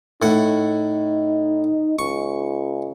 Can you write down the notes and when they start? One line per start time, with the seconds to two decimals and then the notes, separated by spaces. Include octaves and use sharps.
0.22 A2 D#4 F#5
1.99 C#2 C#6